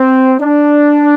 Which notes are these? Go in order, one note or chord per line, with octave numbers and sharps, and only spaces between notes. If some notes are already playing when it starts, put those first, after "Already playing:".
Already playing: C4
D4